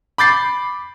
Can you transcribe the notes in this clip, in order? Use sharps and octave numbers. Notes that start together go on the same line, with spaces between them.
B5 D6 G6 A6 C7